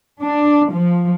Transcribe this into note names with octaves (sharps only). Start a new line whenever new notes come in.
D4
F3